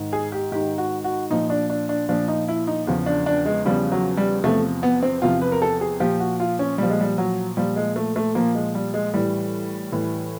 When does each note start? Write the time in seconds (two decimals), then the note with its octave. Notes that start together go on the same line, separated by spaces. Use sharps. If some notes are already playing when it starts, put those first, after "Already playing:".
Already playing: G#2 D#3
0.13 G#4
0.32 G4
0.52 G#2 D#3 G4
0.78 F#4
1.04 F#4
1.30 A#2 F3 D#4
1.50 D4
1.70 D4
1.89 D4
2.09 A#2 F3 D4
2.28 D#4
2.48 E4
2.67 D#4
2.87 E2 C#3 F3
3.06 D4
3.26 D4
3.46 G#3
3.65 E2 C#3 F3 G3
3.92 F#3
4.17 G3
4.44 E2 C3 F3 A3
4.83 B3
5.03 C4
5.22 E2 C3 F3 F4
5.42 B4
5.52 A#4
5.62 A4
5.81 G#4
6.00 A#2 F3 G4
6.20 F#4
6.40 F4
6.59 C#4
6.78 A#2 F3 G3
6.90 G#3
7.01 G3
7.18 F#3
7.57 A#2 F3 G3
7.76 G#3
7.96 A3
8.16 A3
8.35 A#2 F3 A#3
8.55 G#3
8.75 G3
8.94 G#3
9.14 A2 E3 G3
9.92 A2 E3